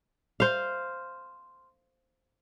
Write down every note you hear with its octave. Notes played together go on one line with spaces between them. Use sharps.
C5 F5